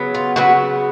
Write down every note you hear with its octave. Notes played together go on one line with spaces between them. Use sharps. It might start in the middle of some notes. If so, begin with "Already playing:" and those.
Already playing: C#3 F#3 B3
F4
C#3 F#3 B3 F#4